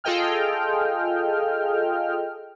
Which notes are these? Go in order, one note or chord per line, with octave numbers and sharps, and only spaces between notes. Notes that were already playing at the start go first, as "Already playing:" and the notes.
F4 G#4 A4 D#5 G5 F6